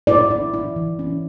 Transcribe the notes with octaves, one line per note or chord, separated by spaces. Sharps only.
E4 D5
E4
E4
E3
C#4